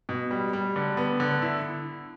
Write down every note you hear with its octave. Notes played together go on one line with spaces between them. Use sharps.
B2
G3
G3
D3
B3
D3
E4